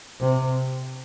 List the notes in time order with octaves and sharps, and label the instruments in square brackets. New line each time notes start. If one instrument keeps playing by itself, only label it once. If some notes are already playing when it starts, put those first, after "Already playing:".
[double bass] C3